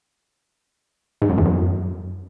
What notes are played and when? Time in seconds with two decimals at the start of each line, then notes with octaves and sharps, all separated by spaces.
1.22 G#2
1.30 F#2
1.38 E2
1.46 F#2